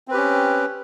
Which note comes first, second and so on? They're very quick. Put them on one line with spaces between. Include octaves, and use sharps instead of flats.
C4 B4 G4 C#4